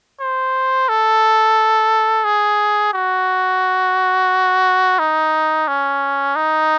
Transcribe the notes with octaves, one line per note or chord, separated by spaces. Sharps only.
C5
A4
G#4
F#4
D#4
C#4
D#4